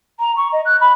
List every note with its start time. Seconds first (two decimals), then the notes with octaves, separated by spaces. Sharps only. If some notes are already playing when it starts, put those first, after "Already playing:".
0.20 A#5
0.37 C#6
0.52 D#5
0.65 F#6
0.81 B5